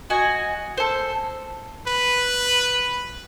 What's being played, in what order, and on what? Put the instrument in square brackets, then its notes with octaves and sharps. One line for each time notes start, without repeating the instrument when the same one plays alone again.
[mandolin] F#4 D#5 G#5
A4 C5
[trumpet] B4